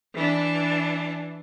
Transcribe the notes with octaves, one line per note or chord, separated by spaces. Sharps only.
E3 D4